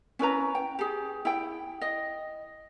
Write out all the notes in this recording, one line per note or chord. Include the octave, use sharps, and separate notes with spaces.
C#4 E4 B4 A#5
G5
G4 G#4
E4 G5
D#5